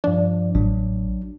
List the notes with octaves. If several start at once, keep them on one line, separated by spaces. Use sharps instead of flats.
G2 F3 D4
A1 F#3 D4